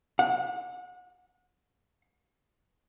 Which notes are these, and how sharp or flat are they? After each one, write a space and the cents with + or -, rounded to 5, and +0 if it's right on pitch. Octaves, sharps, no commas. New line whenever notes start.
F#5 -35